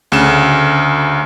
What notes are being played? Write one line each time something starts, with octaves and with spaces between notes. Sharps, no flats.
D2 C#3 E7